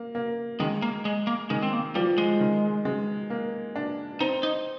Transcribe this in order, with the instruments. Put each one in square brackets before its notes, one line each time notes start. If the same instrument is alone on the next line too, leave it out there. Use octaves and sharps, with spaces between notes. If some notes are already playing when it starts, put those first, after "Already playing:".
Already playing: [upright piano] A#3
A#3
[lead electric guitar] D#3 [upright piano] G#3
[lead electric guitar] A#3
G#3
A#3
[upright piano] D#3 [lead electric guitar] G#3
[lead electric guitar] C4
A#3
[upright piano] F3 [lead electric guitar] G3
[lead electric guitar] G#3
[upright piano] D#3
G#3
A#3
D4
[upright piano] C4 [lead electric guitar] D#4
[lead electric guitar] D#4